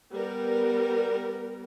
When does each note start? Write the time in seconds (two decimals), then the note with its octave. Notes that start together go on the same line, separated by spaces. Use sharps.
0.13 G3 B3 A#4